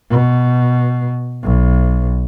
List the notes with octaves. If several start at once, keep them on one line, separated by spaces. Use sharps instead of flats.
B2
B1